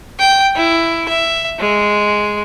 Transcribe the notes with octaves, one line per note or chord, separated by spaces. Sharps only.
G5
E4
E5
G#3